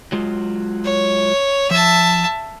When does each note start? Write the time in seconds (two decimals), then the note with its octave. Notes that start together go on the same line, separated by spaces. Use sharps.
0.12 F#3 G#3 F4
0.85 C#5
1.71 F3 E5 A5